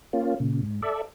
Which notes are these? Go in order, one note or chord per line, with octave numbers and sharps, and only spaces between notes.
A#3 C#4 F4
A#2 C#3
G#2
A4 D5 E5